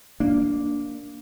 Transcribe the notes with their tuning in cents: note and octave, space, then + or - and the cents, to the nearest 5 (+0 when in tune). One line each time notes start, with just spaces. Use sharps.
A#3 +0 D4 -10